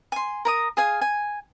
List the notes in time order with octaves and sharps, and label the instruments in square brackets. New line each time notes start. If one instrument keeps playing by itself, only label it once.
[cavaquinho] G#5 C6
A#4 A#5 D#6
G#4 F5 G#5
G#5